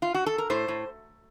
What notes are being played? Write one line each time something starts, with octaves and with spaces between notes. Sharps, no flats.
F4
F#4
A4
A#4
A2 C5
A2